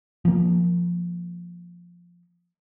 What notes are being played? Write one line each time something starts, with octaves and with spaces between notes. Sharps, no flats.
F3 A#3